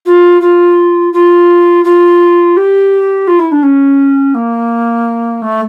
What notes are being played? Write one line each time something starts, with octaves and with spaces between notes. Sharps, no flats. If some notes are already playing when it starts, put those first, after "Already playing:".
F4
F4
F4
F4
G4
F4
E4
D4
C#4
A#3
A3